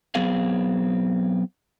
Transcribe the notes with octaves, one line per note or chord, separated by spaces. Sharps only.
F#3 B3 C4 G#4 F5